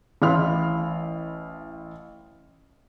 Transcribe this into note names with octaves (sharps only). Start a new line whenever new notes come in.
A1 E4 F5 B5 C6 F6